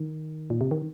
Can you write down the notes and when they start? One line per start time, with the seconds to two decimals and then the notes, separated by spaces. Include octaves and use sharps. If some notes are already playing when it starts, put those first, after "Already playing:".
Already playing: D#3
0.50 A#2
0.61 C3
0.71 D#3